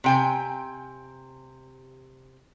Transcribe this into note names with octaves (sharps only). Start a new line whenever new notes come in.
C3 G5 G#5